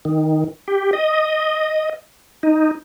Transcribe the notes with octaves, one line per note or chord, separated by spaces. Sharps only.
D#3
G4
D#5
D#4